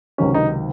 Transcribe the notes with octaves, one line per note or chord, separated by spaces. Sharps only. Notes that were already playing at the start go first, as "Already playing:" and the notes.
C#2 C3 D#3 F#3 C#4
D#4